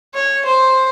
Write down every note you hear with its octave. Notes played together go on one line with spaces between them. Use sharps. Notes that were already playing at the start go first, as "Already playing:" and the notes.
C#5
C5